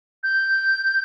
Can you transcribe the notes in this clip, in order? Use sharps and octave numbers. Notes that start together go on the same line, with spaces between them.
G6